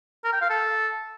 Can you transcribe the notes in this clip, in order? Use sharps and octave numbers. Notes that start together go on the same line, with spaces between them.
A#4
G5
F5
A4